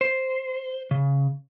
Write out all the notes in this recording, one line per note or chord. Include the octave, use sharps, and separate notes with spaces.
C5
C#3